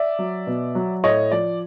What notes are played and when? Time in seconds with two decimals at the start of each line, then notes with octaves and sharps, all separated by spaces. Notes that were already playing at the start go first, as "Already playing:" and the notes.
Already playing: D5 E5
0.19 F#3
0.47 B2
0.75 F#3
1.04 A2 C#5 D#5
1.32 F3 D5